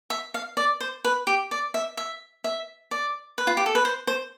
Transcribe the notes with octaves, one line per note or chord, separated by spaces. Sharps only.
E5
F5
D5
C5
B4
G4
D5
E5
E5
E5
D5
B4
F4
G4
A4
B4
C5
C5